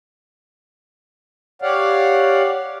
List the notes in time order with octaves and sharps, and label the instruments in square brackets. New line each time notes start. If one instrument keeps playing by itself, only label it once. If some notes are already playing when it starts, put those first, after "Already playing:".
[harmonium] G4 C#5 D5 F5 F#5